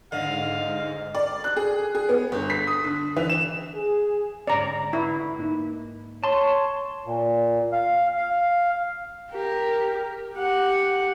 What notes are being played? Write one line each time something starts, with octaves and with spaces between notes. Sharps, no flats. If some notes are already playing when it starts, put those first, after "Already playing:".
G#2 D3 D#5 F5
D5
F#6
G#4
G#4
B3
G1
B6
D#6
D3
E3
E7
G#4
G#2 D3 C#4 D5 A#5
E4
G#2 A#3 D#4
C#5 A5 C6
A#2
F5
F5
G4 A#4
G4 F#5